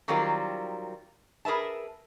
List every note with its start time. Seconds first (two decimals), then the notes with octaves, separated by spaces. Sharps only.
0.08 D#3 F#3 G3 C4 F4 A#4
1.45 G#4 A#4 B4 E5 A5